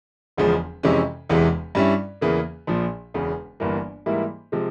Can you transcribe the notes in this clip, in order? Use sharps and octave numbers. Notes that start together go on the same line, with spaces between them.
E1 E2 C#3 F3 G#3
F2 C3 E3 G#3 C#4
E1 E2 C3 E3 G#3
G2 G3 C#4 E4
E2 C#3 E3 A#3
A#1 A#2 F3
E1 E2 C#3
G1 G2 E3 A#3
G#2 E3 G3 A#3 E4
C3 F3 G#3